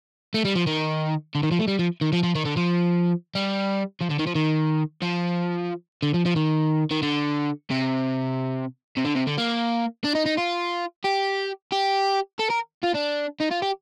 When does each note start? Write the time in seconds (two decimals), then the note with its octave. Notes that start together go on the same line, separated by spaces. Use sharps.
0.34 A3
0.45 G3
0.55 F3
0.67 D#3
1.35 D3
1.43 D#3
1.52 F3
1.59 A3
1.68 G3
1.79 F3
2.01 D#3
2.13 F3
2.23 F3
2.35 D#3
2.45 D3
2.57 F3
3.35 G3
4.01 F3
4.11 D3
4.19 D#3
4.27 F3
4.35 D#3
5.02 F3
6.03 D3
6.14 F3
6.26 F3
6.36 D#3
6.91 D#3
7.03 D3
7.71 C3
8.97 C3
9.05 D3
9.15 C3
9.27 D3
9.38 A#3
10.04 D4
10.15 D#4
10.26 D#4
10.38 F4
11.05 G4
11.72 G4
12.39 A4
12.50 A#4
12.83 F4
12.94 D4
13.40 D#4
13.51 F4
13.62 G4